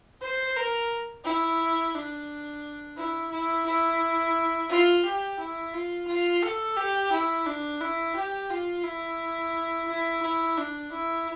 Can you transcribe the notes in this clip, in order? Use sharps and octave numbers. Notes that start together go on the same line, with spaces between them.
C5
A#4
E4
D4
E4
E4
E4
F4
G4
E4
F4
F4
A4
G4
E4
D4
E4
G4
F4
E4
E4
E4
D4
E4